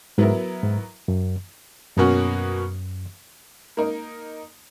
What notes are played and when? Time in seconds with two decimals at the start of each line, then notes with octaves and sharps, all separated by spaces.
0.18 G#2 F#3 B3 E4 A#4
0.63 G#2
1.08 F#2
1.97 F#2 B2 A#3 C#4 F#4
3.77 A#3 D#4 A#4